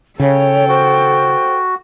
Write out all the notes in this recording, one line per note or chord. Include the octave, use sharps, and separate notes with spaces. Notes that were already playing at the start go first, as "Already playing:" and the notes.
C#3 A4 C#5 G5
F#4 C5